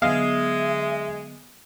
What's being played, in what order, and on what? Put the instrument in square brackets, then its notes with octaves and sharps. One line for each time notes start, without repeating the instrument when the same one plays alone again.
[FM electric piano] D3 F#3 B3 [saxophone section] G#3 [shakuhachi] E5 [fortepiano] F5